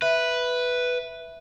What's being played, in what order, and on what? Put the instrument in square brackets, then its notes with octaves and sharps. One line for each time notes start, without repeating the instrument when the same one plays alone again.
[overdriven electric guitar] B4 [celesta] E5